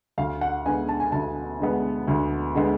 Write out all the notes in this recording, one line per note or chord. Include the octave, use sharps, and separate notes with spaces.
D2 F5
F#5
D3 G#3 B3 G#5
A5
G#5
D2 A5
D3 G#3 B3
D2
D3 G#3 B3